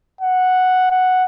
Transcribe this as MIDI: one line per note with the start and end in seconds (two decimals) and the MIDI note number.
0.21 0.90 78
0.91 1.25 78